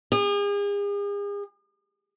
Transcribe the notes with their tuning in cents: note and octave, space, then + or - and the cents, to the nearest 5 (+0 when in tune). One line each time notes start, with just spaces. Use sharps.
G#4 -40